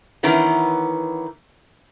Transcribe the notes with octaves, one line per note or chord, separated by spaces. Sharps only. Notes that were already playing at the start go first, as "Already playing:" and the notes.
D#3 E3 B3 C#4